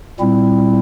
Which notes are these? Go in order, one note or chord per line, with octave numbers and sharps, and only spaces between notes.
A#2 G3 C4 E4